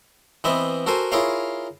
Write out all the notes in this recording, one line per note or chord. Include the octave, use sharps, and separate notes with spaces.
E3 B3 C4 D#5 E5
F#4 A4 A#4 C5 G#5
E4 F4 G#4 A#4 C#5 F5